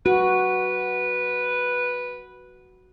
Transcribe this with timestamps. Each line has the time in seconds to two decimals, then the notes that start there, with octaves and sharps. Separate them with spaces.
0.06 F#4 B4